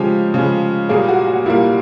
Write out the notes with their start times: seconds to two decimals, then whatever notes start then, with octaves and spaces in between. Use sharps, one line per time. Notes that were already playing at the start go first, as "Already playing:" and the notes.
Already playing: C#3 F3 G#3 G4
0.34 C#3 F3 G#3
0.89 A#2 G3 A#3 G#4
1.08 F#4
1.28 F#4
1.46 A#2 G3 A#3 E4